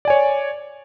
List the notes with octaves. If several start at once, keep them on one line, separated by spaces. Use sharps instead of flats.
C#5 D5 G#5